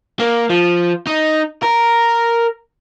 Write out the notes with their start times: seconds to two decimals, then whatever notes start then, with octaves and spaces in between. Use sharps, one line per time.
0.20 A#3
0.50 F3
1.07 D#4
1.63 A#4